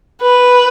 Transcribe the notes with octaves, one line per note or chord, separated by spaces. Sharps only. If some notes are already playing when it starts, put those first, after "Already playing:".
B4